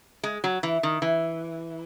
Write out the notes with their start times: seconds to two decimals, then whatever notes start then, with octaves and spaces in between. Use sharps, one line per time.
0.23 G#3
0.44 F#3
0.63 E3
0.83 D#3
1.02 E3